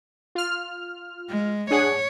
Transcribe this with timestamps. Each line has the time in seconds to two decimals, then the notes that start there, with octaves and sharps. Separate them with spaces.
0.35 F4 F6
1.29 G#3
1.71 D4 G#4 C#5 F#5